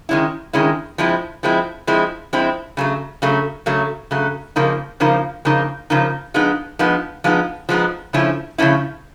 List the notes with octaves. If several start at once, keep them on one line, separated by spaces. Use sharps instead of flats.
D#3 G#3 C#4 E4
D#3 G#3 C#4 E4
F3 G#3 C4 E4
F3 G#3 C4 E4
F3 G#3 C4 E4
F3 G#3 C4 E4
C#3 F#3 A3
C#3 F#3 A3
C#3 F#3 A3
C#3 F#3 A3
C#3 F3 A#3 D#4
C#3 F3 A#3 D#4
C#3 F3 A#3 D#4
C#3 F3 A#3 D#4
F3 G#3 B3 D#4
F3 G#3 B3 D#4
F3 G#3 B3 D#4
F3 G#3 B3 D#4
C#3 F3 A3 C#4 E4
C#3 F3 A3 C#4 E4